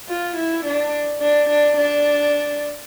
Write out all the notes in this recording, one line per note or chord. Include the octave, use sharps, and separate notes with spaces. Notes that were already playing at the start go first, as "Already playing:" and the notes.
F4
E4
D4
D4
D4
D4